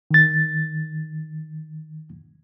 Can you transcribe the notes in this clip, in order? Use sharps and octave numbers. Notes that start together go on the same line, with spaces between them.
D#3 A6